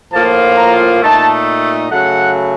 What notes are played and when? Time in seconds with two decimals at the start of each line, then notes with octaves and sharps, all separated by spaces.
0.12 A2 F3 A#3 F4 A5
0.57 A#5
1.01 A#2 A3 D#4 A5
1.90 C#3 F#3 A3 F#5